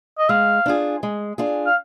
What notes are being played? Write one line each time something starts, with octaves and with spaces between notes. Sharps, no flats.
D#5
G#3 F5
D4 F4 G#4
G#3
D4 F4 G#4
F5